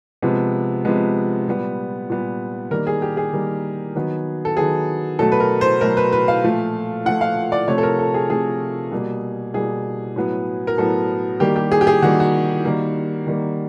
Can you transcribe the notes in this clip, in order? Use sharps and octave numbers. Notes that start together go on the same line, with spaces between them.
C3 F3 G#3 B3
C3 F3 G#3 B3
A#2 G3 B3
A#2 G3 B3
D#3 G3 A#3 A#4
G#4
G4
G#4
D#3 G3 A#3
D#3 F#3 B3
A4
D#3 F#3 B3 G#4
B2 F#3 A3 A4
B4
A#4
C5
B2 F#3 A3 A#4
B4
B4
F5
A#2 F3 A3
A#2 F3 A3 F#5
F5
D5
C3 F3 A3 C#5
A4
A#4
A4
G#4
C3 F3 A3 G#4
B2 G3 A#3
B2 G3 A#3 G#4
A2 F#3 B3
A#4
A2 F#3 B3 A4
D#3 G3 A#3 G4
G4
G#4
G4
G#4
D#3 G3 A#3 F#4
F#4
D#3 G3 A#3
D#3 G3 A#3